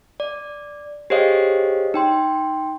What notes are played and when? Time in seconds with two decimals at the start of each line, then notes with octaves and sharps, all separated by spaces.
0.20 D5
1.10 G4 G#4 C5 C#5 D#5 F5
1.94 D#4 G5 C6